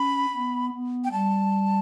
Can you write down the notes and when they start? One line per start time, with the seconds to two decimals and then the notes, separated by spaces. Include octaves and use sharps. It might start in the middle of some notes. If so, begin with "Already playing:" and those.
Already playing: C#4 B5
0.35 B3
0.74 B3
1.04 G5
1.11 G3 A5